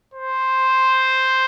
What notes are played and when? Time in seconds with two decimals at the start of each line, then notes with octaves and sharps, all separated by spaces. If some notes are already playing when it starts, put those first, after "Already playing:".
0.14 C5